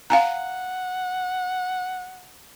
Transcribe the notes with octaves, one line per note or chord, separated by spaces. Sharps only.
F5 F#5 G#5 A#5